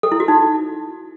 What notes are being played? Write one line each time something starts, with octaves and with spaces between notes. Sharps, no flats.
A4
E4
F#4
D#4